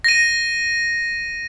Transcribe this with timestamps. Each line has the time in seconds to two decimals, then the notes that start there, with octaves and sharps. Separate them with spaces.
0.04 A#6 D#7